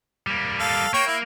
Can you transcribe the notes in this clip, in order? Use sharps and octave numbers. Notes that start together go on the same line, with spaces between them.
G3 A#3
A4 F5
A#3 C#5 G5 C#6
E4